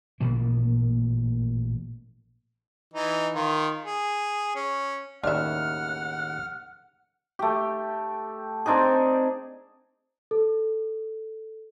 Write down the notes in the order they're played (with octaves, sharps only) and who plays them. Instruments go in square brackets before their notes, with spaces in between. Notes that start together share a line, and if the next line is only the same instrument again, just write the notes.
[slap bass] A1 A#2 F3 A#3
[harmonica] E3 D#4
D#3 F4
G#4
C#4
[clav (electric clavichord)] D#2 A2 C#3 [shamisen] D4 E5 [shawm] F#5 [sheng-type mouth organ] F6
[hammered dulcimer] A3 G4
C4 D4 D#4 G#4
[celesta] A4